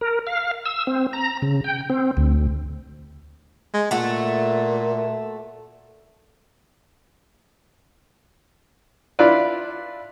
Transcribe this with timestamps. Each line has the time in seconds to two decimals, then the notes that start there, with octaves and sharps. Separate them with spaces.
0.01 A#4
0.27 F5
0.66 E6
0.87 C4
1.13 A#5
1.42 C#3
1.64 G5
1.90 C4
2.17 D2
3.74 G#3
3.91 A#2 A3 F#4
9.19 D4 E4 F4 B4 D5